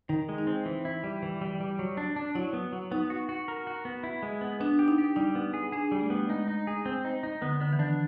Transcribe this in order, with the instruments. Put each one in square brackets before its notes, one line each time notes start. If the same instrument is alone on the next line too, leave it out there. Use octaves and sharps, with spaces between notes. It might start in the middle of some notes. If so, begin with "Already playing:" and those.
[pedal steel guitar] D#3 [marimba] D#4
[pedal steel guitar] G#3
[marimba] D#4
[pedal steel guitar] C4
E3
E4
G3
E3
G3
G3
F#3
D4
D4
[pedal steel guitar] F#3 [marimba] E4
[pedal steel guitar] B3
F#3
[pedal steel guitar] B3 [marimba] D#4
[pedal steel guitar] F#4
F#4
A#4
F#4
B3
E4
G#3
B3
[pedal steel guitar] B3 [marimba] D4
[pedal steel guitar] G4
[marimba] D#4
[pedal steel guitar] G4
[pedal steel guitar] G3 [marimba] D#4
[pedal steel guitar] B3
G#4
[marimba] D4 [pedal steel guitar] G#4
[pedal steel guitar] G3
[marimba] A3
[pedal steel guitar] B3
[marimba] G#3 [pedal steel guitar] D#4
[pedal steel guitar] D#4
G#4
C4
D#4
D#4
[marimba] D3 [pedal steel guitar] B3
[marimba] D3 [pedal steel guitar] B3
[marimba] E3
[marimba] D#3 [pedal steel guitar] D4